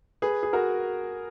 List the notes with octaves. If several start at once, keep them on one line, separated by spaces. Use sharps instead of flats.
G#4 B4
G#4
F#4 A#4